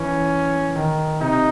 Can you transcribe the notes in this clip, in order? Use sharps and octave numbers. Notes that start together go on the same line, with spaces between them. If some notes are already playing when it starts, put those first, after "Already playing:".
Already playing: E3 C#4
D#3
C3 D#4